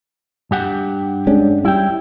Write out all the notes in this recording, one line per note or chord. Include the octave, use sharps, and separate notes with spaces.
G2 G4 F#5
G#3 C#4 D4
G3 E4 G5